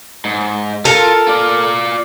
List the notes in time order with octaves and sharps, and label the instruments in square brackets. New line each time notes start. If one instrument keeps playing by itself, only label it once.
[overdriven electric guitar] G#2
[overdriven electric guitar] F4 [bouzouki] A4 A#4
[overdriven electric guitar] F4 D5